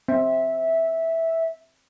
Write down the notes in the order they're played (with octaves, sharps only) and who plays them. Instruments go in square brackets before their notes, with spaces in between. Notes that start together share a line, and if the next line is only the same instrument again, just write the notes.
[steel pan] C4 [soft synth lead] E5